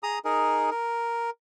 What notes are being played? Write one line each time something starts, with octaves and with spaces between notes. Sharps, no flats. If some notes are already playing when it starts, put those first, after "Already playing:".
G#4 A#5 D#6
D#4 G#4 A#4
A#4